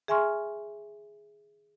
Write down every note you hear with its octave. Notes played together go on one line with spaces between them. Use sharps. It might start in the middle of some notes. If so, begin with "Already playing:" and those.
G#4 E5 G#5 C6 C#6 F6